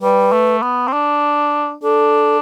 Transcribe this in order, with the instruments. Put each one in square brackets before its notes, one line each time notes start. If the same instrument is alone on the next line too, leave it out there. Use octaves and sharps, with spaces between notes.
[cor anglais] G3 [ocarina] B4
[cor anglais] A3
B3
C4
D4
[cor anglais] D4 [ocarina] A4